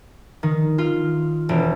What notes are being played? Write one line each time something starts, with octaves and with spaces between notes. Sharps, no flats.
D#3
F4
E1